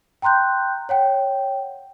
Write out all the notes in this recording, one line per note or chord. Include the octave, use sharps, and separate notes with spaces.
G5 A#5 C6 F#6 G6
C#5 F#5 G5